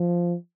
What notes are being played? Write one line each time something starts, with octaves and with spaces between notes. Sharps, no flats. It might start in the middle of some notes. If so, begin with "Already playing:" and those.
Already playing: F3